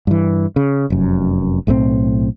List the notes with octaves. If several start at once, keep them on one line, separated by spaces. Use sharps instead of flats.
G2 E3
C#3
F1 F#2
B1 A2 G3 C4